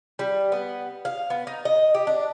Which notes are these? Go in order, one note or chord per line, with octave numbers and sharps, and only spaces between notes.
G3
B3
F5
B3
D#4
D#5
G4
D4